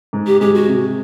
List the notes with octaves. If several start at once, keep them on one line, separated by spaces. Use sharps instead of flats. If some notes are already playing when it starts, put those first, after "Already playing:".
G#2
G4
G#3 G4
F#4
C3